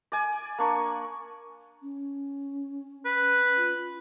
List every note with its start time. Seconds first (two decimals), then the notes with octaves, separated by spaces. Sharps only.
0.12 D5 G#5
0.58 A#3 D4 C#6
1.82 C#4
3.05 B4
3.57 F4